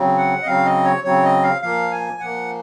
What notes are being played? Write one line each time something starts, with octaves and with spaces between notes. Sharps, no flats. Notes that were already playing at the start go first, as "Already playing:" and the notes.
Already playing: C#3 F#3 C4
F#5
D#5
C#3 F#3 C4 F5
D#5
C#5
C#3 F#3 C4 C#5
D#5
F5
A#2 F3 A#3 F5
G#5
A#2 F3 A#3 F#5